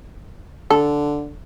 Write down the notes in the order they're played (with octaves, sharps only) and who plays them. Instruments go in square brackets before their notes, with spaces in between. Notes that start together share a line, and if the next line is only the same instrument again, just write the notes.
[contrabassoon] D3 [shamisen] A4